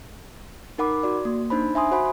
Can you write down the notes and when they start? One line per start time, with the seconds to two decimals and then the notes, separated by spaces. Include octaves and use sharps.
0.78 D#4 A#4 F#5 B5 D6
1.03 F#4 D5
1.25 A#3
1.50 D4 D#4 C5 B5
1.75 E5 G#5 C6 D#6
1.91 F#4 C5 F#5 B5